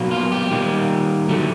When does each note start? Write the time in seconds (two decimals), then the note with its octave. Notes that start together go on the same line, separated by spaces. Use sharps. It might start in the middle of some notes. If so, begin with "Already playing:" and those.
Already playing: B2 F#3 A#3
0.11 F4
0.32 G4
0.51 D#3 G3 A#3
1.29 D3 F#3 A3